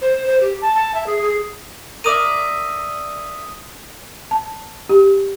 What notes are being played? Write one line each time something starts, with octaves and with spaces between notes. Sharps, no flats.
C5
C5
G4
A5
A5
E5
G#4
G#4
A#4 D5 E5 D#6 D#7
A5
G4